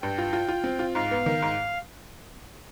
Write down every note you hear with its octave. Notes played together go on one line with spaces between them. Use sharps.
G2 G5
F4
F4
F4
C4
F4
G#2 F5
B3
D#3
G#2